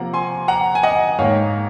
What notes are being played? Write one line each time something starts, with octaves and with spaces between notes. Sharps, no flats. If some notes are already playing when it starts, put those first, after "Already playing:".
Already playing: C3 F3 A#3 F#5 A#5
G#5 C6
F#5 A#5
G#5
D#5 F#5
G#2 D#3 A#3 C#5 F5